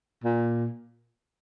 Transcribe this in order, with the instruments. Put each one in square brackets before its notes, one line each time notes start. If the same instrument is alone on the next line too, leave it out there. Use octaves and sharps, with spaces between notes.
[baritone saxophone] A#2